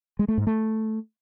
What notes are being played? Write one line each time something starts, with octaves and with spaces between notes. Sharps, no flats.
G#3
A3
G#2
A3